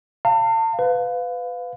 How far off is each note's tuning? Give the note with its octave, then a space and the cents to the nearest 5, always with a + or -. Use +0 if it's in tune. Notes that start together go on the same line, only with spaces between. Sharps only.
F5 +0 A5 +40
B4 +25 F5 +15